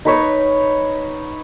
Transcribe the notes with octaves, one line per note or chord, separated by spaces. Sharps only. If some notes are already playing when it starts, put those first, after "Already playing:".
D#4 B4 C#5